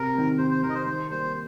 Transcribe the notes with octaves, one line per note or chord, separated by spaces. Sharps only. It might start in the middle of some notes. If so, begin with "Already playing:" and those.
Already playing: C3 A#4
D#3 C4
C3 C5
C5
D#3 C4 A#4
D#5
C5
D#3 C5
G3 A#3 C5